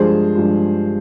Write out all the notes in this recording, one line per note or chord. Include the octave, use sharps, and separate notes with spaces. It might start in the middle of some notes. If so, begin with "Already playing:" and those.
Already playing: G2 F3 G#3 G#4 C5
G2 F3 G#3